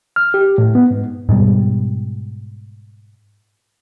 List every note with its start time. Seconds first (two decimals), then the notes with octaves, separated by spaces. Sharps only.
0.16 F6
0.34 G4
0.58 A2
0.75 B3
0.91 G#2
1.29 G#2 B2 G3